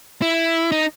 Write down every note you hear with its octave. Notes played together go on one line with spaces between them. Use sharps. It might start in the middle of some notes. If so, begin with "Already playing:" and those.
E4
D#4